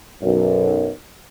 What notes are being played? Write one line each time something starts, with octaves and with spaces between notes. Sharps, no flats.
B1 F#2